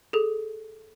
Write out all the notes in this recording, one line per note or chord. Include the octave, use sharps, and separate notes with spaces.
G#4 A4